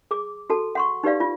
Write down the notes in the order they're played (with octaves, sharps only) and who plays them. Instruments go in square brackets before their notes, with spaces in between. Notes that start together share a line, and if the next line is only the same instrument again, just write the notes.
[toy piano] G#4 D6
F#4 A4 A5
F#5 C6 C#6
D#4 G4 B4 D5 F5
F4